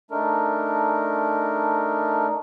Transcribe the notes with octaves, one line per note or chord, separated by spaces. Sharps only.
A3 D4 D#4 A#4